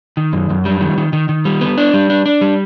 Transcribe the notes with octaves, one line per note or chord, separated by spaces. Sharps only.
D#3
F#2
F#2
G3
D#3
D#3
D#3
D#3
G3
B3
D4
G3
D4
D4
G3